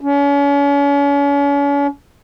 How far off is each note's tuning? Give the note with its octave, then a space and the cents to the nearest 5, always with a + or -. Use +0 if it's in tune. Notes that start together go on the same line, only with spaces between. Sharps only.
C#4 +40